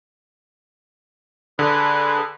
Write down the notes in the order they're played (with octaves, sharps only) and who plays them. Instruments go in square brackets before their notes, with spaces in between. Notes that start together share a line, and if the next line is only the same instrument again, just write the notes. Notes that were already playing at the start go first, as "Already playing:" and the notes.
[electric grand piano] D3 [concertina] G#4 B4